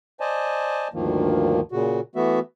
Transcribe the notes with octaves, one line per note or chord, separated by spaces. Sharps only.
C5 D5 D#5 G#5 A5
D2 G2 D#3 F3 A#3
A#2 C#3 F#4
E3 A3 B3 F#4 E5